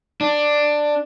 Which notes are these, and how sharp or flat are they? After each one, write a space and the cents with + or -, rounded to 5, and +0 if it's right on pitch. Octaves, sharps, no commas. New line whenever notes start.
D4 +10